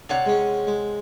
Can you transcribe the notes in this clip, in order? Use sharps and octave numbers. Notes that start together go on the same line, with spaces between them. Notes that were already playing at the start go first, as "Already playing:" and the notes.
C3 C#5 D5 F#5
G#3 C#4
G#3